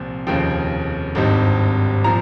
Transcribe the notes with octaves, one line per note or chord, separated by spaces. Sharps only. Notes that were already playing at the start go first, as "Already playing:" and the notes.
Already playing: C2 A#2 F3 C4
F1 D#2 C#3 F3 G5
G#1 G2 G3 C4 D#4
A#2 F3 A#5